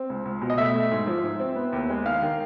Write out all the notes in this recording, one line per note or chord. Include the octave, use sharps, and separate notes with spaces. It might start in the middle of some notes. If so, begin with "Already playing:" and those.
Already playing: C4
C#2
C#2
B2
D#5
A3 E5
A3
G#2
F3
G#2
C4
B3
D#2
G#3
D#3 F5
D#3